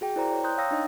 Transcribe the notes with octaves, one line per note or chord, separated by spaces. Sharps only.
F#4 G#4 G5
E4 A#4 C5 D5 G5 A#5
C#5 G5
A#5 C6 D#6 F#6 G6
C#5 F5 G5 D#6 E6 A#6
D4 D#4 D#5